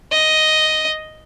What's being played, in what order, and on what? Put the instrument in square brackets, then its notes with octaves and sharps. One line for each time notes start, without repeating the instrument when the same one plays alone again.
[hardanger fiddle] D#5